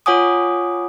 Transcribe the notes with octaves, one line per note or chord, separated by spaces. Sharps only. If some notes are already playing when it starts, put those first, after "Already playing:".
F4 C#5 F#5 G#5 D6 D#6